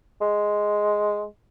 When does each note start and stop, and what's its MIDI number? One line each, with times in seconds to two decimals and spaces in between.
0.21 1.25 56